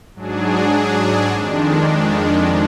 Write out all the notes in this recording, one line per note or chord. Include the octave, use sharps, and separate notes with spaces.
G#2 F#3 D4 G#4
F2 D#3 G#3 D4